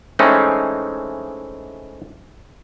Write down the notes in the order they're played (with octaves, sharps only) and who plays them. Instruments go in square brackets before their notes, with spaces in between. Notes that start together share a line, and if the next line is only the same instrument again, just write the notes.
[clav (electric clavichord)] E3 G#3 A3 C4 C#4 D#4